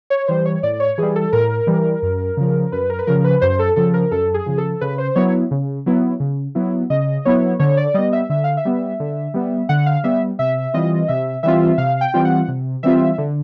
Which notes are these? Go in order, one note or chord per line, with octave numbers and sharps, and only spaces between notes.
C#5
E3 G3 C5
C#5
A2 D5
C#5
E3 G3 G#4
A4
A2 A#4
E3 G3
F#2
C#3 F3
F#2 B4
A#4
B4
C#3 F3 A#4
B4
F#2 C5
A4
C#3 F3 A4
A#4
F#2 A4
G#4
C#3 F3
A4
C#3 B4
C5
F#3 B3 E4 C#5
C#3
F#3 B3 E4
C#3
F#3 B3 E4
C#3 D#5
F#3 B3 E4 C#5
D3 C#5
D5
G3 B3 D#5
E5
D3 E5
F5
E5
G3 B3
D3
G3 B3
D3 F#5
F5
G3 B3 E5
C3 E5
E3 G3 C4 F4 D#5
C3 E5
E3 G3 C4 F4 E5
C3 F5
G5
E3 G3 C4 F4
F#5
C3
E3 G3 C4 F4 E5
D3